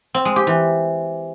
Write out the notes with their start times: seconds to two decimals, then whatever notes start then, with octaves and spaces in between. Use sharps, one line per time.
0.14 C4
0.25 G#3
0.36 G4
0.47 E3